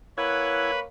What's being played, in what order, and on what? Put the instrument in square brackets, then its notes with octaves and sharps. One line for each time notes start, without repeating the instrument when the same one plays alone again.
[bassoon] A#3 [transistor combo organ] E4 F#5 G#5 [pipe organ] B4 [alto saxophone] C#5